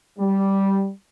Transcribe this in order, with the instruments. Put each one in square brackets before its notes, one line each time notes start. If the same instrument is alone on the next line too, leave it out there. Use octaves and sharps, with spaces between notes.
[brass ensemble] G3